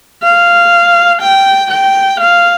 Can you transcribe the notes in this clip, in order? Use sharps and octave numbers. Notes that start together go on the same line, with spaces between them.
F5
G5
G5
F5